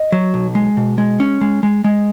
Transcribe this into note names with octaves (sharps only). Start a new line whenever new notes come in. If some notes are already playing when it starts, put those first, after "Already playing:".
Already playing: D#5
F#3
B1
G#3
B2
G#3
C#4
G#3
G#3
G#3